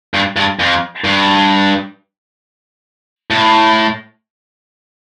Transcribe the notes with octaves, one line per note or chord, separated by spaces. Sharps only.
G2
G2
F2
G2
A2